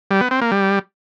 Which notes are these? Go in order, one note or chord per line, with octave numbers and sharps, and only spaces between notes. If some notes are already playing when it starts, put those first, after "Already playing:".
G3
B3
C4
A#3
G3